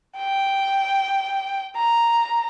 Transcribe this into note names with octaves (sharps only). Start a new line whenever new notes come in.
G5
A#5